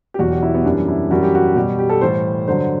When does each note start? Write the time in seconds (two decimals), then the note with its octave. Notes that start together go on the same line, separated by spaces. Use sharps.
0.14 G4
0.19 E2 B2 F#3 F#4
0.30 G4
0.43 E4
0.54 B3
0.65 F#2 E3 G3 D4
0.88 E4
1.11 F#2 E3 G3 F#4
1.23 G4
1.35 F#4
1.56 B2 G3 G4
1.79 G4
1.90 A4
2.01 A2 E3 G3 C5
2.47 G2 D3 F#3 C5